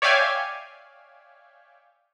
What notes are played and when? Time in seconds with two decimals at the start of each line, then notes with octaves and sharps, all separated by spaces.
0.02 C#5 D5 E5 F5 G5 G#5